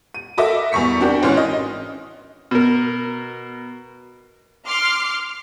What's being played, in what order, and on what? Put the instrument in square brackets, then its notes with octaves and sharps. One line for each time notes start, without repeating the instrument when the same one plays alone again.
[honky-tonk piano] D#7
F#4 A4 A#4 D#5 E5 D6
E2 G3 C#6 B6 C#7
C4 D4 F#4 G4 A#4
G#1 G#2 E3 C#4 C6 F6
D#5
[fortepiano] B2 A#4
[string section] C6 D6 F6 C7